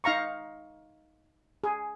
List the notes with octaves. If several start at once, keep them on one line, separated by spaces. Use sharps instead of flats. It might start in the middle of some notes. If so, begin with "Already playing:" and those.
D#4 F5 A#5 C#6
G#4